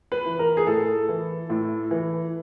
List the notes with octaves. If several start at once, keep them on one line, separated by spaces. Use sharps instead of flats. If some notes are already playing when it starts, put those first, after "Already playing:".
B4
E3
A#4
G#4
A2 A4
E3
A2
E3